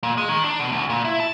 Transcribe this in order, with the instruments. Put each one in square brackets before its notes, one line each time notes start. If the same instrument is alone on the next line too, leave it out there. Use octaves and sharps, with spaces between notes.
[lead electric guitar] A#2
G#3
D#3
D4
B2
D2
A#2
E4
A5